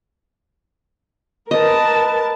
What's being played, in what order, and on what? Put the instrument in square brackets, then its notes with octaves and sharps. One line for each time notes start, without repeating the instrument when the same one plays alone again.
[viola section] A#4 B4 A5 [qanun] D#5